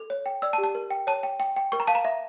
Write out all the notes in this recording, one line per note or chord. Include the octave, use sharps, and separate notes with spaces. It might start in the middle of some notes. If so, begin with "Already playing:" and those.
Already playing: A4
C#5
G5
D5 E6
A5
G4
A5
A#4
G5
C#5 A5
G5
G5
G5
A#4 C#6
A#5
F5 A5
A#5
E5